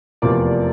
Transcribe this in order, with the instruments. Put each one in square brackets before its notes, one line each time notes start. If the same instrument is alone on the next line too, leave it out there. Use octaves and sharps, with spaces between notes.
[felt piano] F1 E2 C3 F3 A#3 [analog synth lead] D5